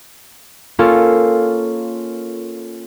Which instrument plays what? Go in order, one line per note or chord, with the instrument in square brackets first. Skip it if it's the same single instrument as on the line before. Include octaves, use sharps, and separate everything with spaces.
[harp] A#3 C#4 F4 A4